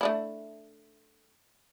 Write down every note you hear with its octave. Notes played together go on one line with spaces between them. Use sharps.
A3 D4 E4